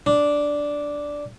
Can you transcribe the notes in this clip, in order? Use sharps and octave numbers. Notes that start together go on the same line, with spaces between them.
D4